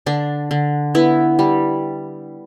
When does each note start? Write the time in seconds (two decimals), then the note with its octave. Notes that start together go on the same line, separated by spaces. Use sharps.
0.06 D3 D4
0.51 D3
0.95 B3 E4
1.39 G3